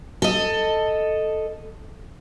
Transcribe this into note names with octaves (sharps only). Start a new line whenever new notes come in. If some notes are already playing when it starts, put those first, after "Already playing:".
A4 D#5